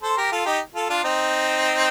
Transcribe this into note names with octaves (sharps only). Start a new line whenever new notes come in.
A4 C5
G4 A#4
F4 A4
D#4 G4
F4 A4
D4 F4
C4 D#4